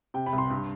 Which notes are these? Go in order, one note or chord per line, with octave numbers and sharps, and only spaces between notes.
C3 G5
B5
C2
C6
G2